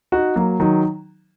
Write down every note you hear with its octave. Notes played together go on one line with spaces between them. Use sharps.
D#4 F#4
F#3 A#3
D#3 F#3